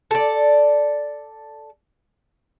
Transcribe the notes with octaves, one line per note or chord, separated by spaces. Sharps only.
A4 D5